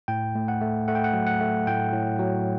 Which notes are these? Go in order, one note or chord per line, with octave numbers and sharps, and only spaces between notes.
A2 G5
A3
F#5
A3
A3 F#5
G5
F#5
F#3
F#5
A3
A2 G5
A2
F#3